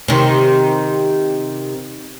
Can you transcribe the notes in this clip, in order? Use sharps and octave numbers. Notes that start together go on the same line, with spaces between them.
C3 D#3